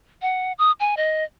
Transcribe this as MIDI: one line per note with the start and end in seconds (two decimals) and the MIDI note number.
0.22 0.53 78
0.58 0.72 87
0.80 0.95 80
0.97 1.24 75